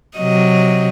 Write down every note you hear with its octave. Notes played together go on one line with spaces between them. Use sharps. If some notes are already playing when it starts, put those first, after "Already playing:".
C3 F#3 D#5